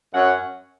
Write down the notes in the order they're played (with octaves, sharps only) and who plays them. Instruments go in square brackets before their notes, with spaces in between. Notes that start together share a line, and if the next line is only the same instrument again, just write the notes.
[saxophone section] F#2 F#3 C#4 F#5